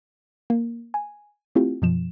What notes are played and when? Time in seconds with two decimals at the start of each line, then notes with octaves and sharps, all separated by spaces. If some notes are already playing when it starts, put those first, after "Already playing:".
0.50 A#3
0.94 G#5
1.55 A3 C4 E4 F4 G4
1.82 F#2 B2 F3 E7